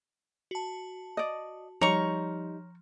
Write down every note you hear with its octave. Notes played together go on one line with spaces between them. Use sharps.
F#4 A5
D5 D#5
F3 G3 D#4 C#5 A#5 C#6